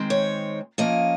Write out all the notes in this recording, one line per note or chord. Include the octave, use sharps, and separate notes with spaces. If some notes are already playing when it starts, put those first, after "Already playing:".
Already playing: D#3 G#3 C4
C#5
F3 A#3 C#4 D#5